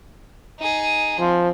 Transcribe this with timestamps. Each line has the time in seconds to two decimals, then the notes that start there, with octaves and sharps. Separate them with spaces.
0.59 D#4 G#4
1.20 F3 C4